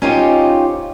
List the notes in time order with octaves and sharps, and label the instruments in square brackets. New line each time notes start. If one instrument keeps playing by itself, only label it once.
[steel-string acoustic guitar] C#4 D#4 F4 G4 C5 C#5